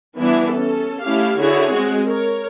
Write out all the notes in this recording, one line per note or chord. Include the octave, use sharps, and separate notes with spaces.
E3 G3 B3 D4 E4
C#4 A4
A3 C#4 E4 G4 F5
D3 E4 F#4 G#4 C#5
G#3 C4 F#4
A#4 C#5